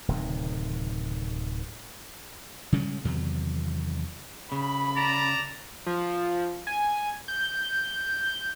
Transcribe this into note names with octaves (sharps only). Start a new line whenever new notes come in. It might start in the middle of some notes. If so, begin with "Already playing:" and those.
D1 C3 D#3
C#3 G3 G#3 C#4
E2 C3 D#3 F#3
C#3 B5
D5 A5 A#5
F3
G#5
G6